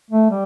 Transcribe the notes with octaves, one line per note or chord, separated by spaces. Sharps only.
A3
G3